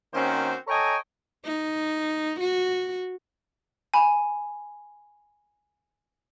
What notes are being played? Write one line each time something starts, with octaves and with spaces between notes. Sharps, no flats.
D#3 A#3 C4 C#4 F#4 C5
A4 C#5 D#5 G5 G#5 A#5
D#4
F#4
G#5 B5